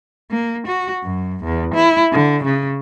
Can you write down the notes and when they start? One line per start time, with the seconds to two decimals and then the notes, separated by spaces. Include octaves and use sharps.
0.31 A#3
0.68 F#4
1.04 F#2
1.44 E2
1.75 E4
2.13 D3
2.44 C#3